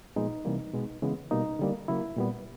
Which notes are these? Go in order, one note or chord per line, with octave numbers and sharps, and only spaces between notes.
A#2 F3 G#3 B3 D#4
C3 E3 G3 A#3
B2 G#3 B3
C#3 E3 G#3 B3
B2 G3 A#3 D#4
D3 G3 A#3
C#3 F#3 A#3 E4
A#2 G3 B3